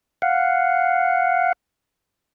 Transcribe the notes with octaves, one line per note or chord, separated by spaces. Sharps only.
F5 F#5